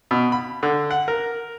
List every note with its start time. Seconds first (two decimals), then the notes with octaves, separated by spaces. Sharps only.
0.11 B2
0.32 B5
0.63 D3
0.91 F#5
1.08 A#4